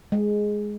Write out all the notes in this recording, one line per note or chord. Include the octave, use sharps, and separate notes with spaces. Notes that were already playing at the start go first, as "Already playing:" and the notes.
G#3